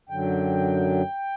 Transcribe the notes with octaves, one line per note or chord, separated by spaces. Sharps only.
F#2 D3 F#3 G5